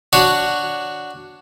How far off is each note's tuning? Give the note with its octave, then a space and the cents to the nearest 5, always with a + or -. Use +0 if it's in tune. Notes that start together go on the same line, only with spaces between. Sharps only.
D4 +0 F#4 +0 C#5 +0